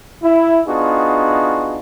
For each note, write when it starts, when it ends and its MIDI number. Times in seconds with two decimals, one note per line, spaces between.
0.23 0.60 64
0.67 1.80 59
0.67 1.80 62
0.67 1.80 63
0.67 1.80 65
0.67 1.80 66
0.67 1.80 68